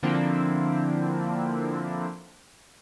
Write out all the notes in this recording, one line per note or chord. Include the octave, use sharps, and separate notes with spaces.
D3 F3 A#3 C4 D4 E4